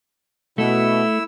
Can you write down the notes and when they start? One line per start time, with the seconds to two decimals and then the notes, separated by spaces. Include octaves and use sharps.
0.58 B2 A3 E4 E6